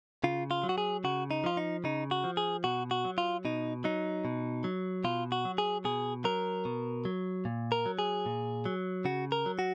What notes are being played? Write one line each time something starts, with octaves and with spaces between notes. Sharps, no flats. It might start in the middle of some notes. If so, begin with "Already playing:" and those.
C#3 F4
F4
F#3
F#4
G#4
C#3 F#4
D#4
F3 F4
D#4
C#3 D#4
F#4
F3
G#4
B2 F#4
F#4
F#3
F4
B2 D#4
F#3 D#4
B2
F#3
B2 F4
F#4
F#3
G#4
B2 G#4
F#3 A#4
B2
F#3
A#2
A#4
F#3
G#4
A#2
F#3
C#3 F#4
A#4
F#3
F#4